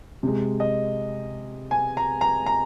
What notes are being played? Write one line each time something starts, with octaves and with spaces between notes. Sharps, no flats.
C3 G#3
D#5
G#5
A#5
A#5
A#5